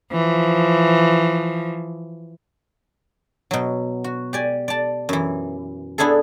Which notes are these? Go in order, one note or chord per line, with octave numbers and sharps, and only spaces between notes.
E3 F3
B2 F#3
F#4
G4 D5 G#5
D5 A5
F#2 E3
B3 D4 E4 G#4 A4